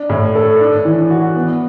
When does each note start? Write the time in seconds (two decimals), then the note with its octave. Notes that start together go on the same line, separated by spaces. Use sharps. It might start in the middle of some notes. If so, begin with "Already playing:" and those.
Already playing: D4
0.10 A2
0.35 A4
0.60 D4
0.85 E3
1.10 F#4
1.36 B3